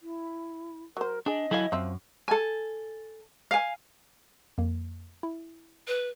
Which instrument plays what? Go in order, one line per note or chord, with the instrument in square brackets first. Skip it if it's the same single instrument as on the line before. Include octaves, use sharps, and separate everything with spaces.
[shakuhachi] E4
[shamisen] F#3 C5 [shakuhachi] A#4
[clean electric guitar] D4 [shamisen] G#4 G#5 [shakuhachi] D#5
[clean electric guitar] F#3 E4 G#5 [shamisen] A4 F5
[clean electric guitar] F#2 [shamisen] F3 C4 E5
[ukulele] A4 G#5
F5 G#5
[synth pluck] F2 A#3
E4
[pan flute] B4